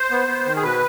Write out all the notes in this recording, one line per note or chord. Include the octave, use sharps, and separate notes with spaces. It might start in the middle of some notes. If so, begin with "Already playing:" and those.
Already playing: C5
B3
B3
D#3
G#4
B2 B4